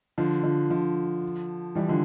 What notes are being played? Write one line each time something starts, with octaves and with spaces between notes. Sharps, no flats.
D3 F3
D3 F3
D3 F3
E3 G3
D3 F3